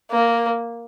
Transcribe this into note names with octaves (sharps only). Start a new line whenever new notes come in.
A#3